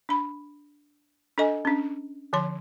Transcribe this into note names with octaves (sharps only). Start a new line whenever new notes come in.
D4 B5
D4 A4 D#5 G#5
C#4 D4
D3 F3 C#5 C6